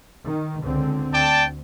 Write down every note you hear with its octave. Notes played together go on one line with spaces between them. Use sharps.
D#3
C#2 D3 C4
D2 D5 G5 A5